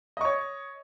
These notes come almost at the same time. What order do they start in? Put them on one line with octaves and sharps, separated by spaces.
D#5 C#6 C#5